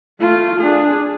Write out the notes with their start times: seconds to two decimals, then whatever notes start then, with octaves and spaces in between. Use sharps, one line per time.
0.20 A3 F4
0.60 D4 G#4